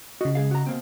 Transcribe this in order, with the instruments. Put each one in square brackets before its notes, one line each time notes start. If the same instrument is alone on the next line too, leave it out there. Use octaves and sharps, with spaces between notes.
[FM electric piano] C#3 D#5 [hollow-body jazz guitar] F#4
[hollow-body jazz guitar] G#3 G#4 F5
F#4 A#5
B2 A#3 C4